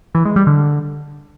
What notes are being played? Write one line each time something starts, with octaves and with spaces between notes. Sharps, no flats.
E3
G#3
G3
D3